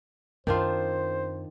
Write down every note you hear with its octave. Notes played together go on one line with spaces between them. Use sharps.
F#2 D#3 C4 D4 F4 C5